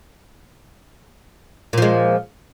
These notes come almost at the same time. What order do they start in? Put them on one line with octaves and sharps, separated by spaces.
A#2 F3 G#3